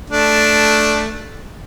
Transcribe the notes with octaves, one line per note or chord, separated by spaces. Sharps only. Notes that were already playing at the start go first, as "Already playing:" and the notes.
A3 D4